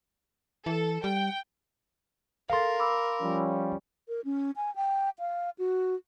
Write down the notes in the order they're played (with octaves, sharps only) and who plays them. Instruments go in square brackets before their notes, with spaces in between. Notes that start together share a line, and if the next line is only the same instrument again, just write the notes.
[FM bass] E3 [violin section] A4
[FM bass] G3 [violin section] G5
[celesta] A4 A6 [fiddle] A#4 [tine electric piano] F5 C6
[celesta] B5 D6 E6
[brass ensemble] F3 G3 C#4
[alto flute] A#4
C#4
G#5
G5
F5
F#4